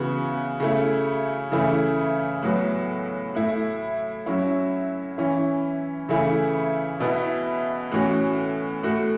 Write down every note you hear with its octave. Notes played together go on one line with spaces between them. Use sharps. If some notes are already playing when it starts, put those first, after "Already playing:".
Already playing: C#3 E3 B3 F#4
C#3 A3 E4
C#3 E3 A3 E4
A2 F#3 B3 F#4
A2 A3 E4
F#3 C#4 E4
E3 C#4 E4
C#3 E3 A3 E4
B2 B3 E4
A2 E3 C#4 F#4
A2 A3 F#4